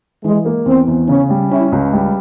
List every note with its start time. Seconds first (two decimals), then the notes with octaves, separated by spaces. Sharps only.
0.24 E3 G#3
0.45 A#3
0.66 E2 C4
0.88 E2
1.08 C#3 C#4
1.30 G3
1.51 C#4 E4
1.72 C#2
1.93 G3